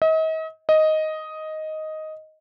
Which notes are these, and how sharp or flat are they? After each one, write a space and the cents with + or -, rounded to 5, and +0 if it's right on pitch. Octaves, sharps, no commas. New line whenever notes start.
D#5 +40
D#5 +5